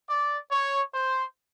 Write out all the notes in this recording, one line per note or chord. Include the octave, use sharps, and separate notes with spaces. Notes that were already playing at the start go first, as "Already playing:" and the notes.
D5
C#5
C5